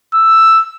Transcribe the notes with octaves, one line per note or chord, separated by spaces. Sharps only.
E6